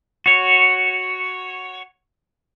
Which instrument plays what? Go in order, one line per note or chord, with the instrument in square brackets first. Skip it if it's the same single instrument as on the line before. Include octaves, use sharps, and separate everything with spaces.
[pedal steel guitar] F#4 C#5